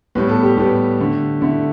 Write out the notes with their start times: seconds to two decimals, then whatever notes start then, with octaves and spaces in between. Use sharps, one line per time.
0.15 A2 G3 B3 B4
0.29 A4
0.43 G4
0.57 A2 G3 B3
0.99 D3 A3
1.41 D3 A3 E4